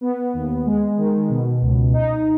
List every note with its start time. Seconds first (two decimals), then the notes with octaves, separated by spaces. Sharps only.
0.01 B3
0.34 D#2
0.66 G#3
0.98 D#3
1.29 B2
1.62 C#2
1.93 D#4